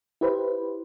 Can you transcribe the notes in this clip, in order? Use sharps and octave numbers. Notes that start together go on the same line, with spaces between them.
E4 G4 B4 C5